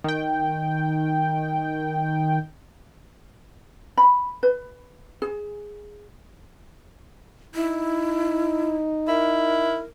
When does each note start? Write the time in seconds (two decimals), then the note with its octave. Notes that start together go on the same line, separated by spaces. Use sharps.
0.04 D#3 G5
3.97 B5
4.43 B4
5.22 G#4
7.55 D#4 E4
9.08 E4 A#4